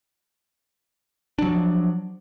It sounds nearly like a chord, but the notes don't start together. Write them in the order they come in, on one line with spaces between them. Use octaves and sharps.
D4 F#3 F3